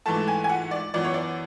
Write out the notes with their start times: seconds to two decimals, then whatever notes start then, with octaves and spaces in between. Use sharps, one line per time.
0.06 G#2 E3 A3 A5
0.28 G#5
0.44 G#5
0.49 F#5
0.71 D5
0.94 F#2 E3 B3 D5
1.04 C#5
1.14 D5